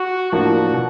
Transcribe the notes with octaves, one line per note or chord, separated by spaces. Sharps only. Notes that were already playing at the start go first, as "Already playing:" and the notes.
Already playing: F#4
A2 F3 A#3 D4 F#4
B2